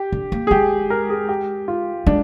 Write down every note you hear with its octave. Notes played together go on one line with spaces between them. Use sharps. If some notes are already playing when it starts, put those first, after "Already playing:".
Already playing: G4
D3
A#3
G#4
G#3 G4
A#4
G#4
G4
F4
G#3 D4